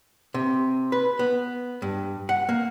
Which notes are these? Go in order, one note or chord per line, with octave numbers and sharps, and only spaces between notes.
C3
B4
B3
G2
F#5
A#3